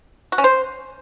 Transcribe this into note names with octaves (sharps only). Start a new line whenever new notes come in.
F#4
C#4
C5